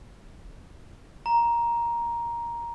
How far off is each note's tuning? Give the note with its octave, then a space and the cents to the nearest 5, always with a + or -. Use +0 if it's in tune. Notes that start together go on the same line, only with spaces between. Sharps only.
A#5 +10